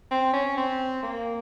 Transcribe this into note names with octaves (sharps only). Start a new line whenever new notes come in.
C4
C#4
C4
A#3